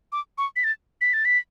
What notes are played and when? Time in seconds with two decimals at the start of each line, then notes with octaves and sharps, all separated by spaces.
0.12 D6
0.38 C#6
0.56 B6
0.64 A6
1.01 B6
1.13 A6
1.25 B6